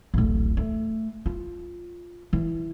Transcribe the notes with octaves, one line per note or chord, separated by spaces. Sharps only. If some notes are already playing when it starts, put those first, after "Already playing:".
D1 A1
A3
F4
E3